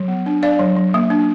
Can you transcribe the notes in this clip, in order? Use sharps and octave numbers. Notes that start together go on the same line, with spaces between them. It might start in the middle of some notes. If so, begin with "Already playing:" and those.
Already playing: F#3
B3
D4
D4 D5 F5
F#3
F#3
A#3
D4